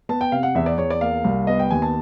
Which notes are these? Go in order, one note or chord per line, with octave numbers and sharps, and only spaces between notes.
B3 A5
G5
C3 F5
F#5
E2 E5
D5
E2 C#5
D5
A#3 F5
C2
B3 D#5
G5
D#2 G#5
A5